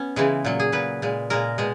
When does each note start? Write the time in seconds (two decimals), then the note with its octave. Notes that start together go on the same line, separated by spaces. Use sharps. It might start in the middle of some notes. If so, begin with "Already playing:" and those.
Already playing: B3 C#4
0.16 C#3 E3 G#3
0.45 A#2 F#3
0.59 G#4
0.72 A#2 F#3 B4
1.02 A#2 G#3
1.30 A#2 G#3 A#4
1.58 B2 G#3